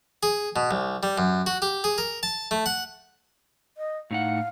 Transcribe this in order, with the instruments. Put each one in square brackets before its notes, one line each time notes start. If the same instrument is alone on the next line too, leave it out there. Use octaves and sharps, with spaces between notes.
[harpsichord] G#4
B2
C2
G3
F#2
F#4
G4
G#4
A#4
A5
A3
F#5
[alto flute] D#5
[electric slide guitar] A2 D#4 F#5 [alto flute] F5